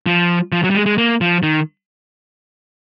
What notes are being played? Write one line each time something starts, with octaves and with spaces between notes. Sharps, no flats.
F3
F3
F#3
G3
G#3
G#3
A#3
F3
D#3